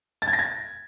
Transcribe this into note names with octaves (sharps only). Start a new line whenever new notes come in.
A6
G#6
A#6
G#6